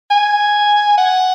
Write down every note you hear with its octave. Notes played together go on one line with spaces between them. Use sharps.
G#5
F#5